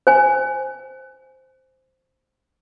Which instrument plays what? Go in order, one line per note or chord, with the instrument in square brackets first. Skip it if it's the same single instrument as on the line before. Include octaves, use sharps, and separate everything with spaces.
[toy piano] C5 G#5